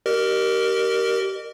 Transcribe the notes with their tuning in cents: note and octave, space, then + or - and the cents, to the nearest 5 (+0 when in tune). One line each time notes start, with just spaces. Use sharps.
G4 -30 A#4 +0 D#5 -40